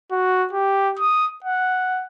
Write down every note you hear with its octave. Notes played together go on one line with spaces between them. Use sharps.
F#4
G4
D#6
F#5